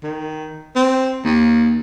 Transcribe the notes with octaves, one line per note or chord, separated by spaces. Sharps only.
D#3
C4
D#2